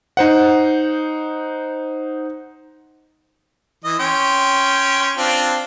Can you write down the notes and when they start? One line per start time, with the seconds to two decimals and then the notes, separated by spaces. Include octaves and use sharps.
0.17 D#4 C5 F#5
3.84 E3 D#5
3.99 C#4 G5 C6
5.17 C4 D4 F4